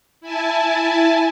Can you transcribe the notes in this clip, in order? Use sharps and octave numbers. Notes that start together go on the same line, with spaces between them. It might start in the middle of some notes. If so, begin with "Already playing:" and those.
E4 G#5 A5